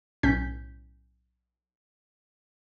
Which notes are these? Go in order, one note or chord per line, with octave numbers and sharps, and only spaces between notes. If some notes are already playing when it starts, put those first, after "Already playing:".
B1 A2 C#4 G6 B6